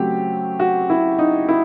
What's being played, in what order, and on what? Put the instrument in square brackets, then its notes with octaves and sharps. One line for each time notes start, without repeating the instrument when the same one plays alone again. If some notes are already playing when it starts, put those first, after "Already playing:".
Already playing: [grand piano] C#3 F#3 A3 C4 G4
F#4
E4
D#4
E4